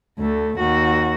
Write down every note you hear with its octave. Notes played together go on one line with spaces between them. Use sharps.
D2 A3
D#2 F#4